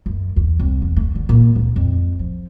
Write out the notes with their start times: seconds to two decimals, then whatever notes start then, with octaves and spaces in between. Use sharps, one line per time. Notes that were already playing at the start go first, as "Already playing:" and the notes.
0.06 F#2
0.36 E2
0.59 C2
0.82 E2
0.97 A3
1.15 D3
1.29 A#2
1.56 C#2
1.76 F2
2.19 F3